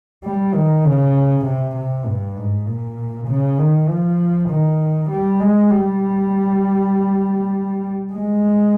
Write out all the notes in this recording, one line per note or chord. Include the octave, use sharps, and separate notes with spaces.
G3
D#3
C#3
C3
C3
G2
G#2
A#2
C#3
D#3
F3
D#3
G3
G#3
G3
G#3